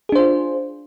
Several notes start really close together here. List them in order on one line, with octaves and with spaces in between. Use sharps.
G#4 D4 C5 F4